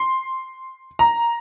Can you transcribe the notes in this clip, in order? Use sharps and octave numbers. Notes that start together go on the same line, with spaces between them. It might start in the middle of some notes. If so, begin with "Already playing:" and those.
Already playing: C6
A#5